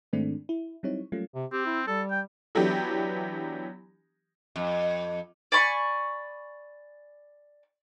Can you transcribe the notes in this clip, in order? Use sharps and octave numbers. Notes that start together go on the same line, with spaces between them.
G#2 D#3 G#3 A3 C4 D4
E4
F#3 G3 C4 D#4 E4 C#5
F#3 G3 A3 A#3 C#4 F4
C3
C4 G4
E4
G3 A4
G5
E3 F#3 B3 D4 G4
F2
D5 G#5 B5 C#6